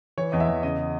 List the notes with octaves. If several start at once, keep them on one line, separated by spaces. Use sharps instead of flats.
E3 C#5
E2 D#5
E5
E2
C#3 D#5